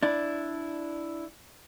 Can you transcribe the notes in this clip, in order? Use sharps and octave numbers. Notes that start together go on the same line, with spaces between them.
D4 E4